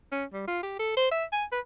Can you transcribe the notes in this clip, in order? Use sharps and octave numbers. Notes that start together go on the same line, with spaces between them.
C#4
G3
F4
G4
A4
C5
E5
G#5
B4